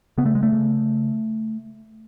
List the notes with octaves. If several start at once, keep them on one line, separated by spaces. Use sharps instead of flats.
C#3 B3
A3
G#3
A3
C#3